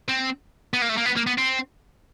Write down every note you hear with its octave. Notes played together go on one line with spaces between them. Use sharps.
C4
B3
A#3
A3
A#3
B3
A#3
B3
C4